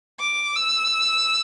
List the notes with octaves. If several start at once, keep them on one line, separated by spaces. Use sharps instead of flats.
D6
E6